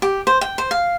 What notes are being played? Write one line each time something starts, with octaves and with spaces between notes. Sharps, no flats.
G4
C5
G5
C5
F5